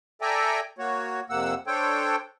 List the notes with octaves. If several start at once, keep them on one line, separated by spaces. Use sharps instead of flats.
A4 D5 E5 G5 G#5 A#5
A#3 F#4 C#5
F2 C3 A#3 F#5 E6
D4 A4 C5 C#5 G5